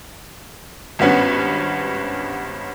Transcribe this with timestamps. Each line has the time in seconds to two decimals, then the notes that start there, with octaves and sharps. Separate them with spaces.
0.99 G#1 G2 B3 C#4